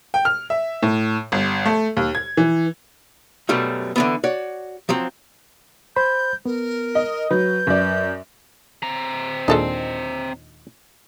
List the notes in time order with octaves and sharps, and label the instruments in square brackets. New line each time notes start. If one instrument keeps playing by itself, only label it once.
[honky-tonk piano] G5
F6
E5
A2
G1
A3
D#2
G#6
E3
[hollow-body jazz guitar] F#2 B2 F#3 G3 A3
D3 E3 B3
F#4 C#5 D5
F3 F#3 C4
[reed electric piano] C5 B5 [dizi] G6
[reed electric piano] B3 [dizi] A#4
[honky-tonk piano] D#5
[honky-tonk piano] F#3 [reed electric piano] B4 [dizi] G6
[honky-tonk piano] F#2 D5
[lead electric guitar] C4 A#5
[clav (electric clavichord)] D#2 A#2 D4 [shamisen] G#3 A4 D#5